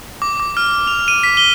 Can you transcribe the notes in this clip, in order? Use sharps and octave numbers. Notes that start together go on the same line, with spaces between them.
D6
D6
F6
F7
D#7
B6
G7